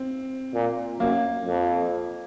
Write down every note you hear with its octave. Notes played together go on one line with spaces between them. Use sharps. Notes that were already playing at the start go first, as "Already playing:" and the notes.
Already playing: C4
A#2
F#2 A#3
F2